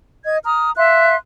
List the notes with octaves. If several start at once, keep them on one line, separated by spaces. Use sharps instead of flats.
D#5 G#6
A#5 D#6 F6
E5 F5 C6 F#6